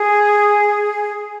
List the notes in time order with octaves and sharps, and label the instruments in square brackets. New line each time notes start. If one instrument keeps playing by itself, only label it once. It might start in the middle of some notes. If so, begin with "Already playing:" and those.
Already playing: [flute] G#4